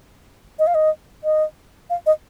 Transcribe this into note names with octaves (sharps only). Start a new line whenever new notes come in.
D#5
F5
D#5
D#5
F5
D#5